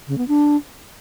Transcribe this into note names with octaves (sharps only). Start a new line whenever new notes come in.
C#3
B3
D4